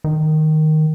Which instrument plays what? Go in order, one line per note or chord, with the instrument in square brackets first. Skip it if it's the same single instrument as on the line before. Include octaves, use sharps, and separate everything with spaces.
[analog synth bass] D#3